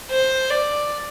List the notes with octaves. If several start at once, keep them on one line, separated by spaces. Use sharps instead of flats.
C5
D5